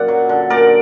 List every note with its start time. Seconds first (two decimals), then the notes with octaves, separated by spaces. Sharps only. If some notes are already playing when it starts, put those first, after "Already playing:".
Already playing: F#2 A#2 D5 F#5
0.08 F#3
0.29 D3
0.50 A#2 A#4 D5